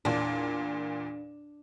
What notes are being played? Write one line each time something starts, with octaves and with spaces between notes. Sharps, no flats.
E2 A#2 D4